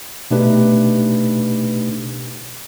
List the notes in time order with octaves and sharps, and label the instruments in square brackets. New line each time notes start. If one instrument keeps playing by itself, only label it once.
[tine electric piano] B2 A3 D4 D#4 G4 B4